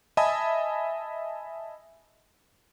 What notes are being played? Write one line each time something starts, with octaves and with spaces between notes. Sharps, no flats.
D#5 E5 G#5 A5 B5 D#6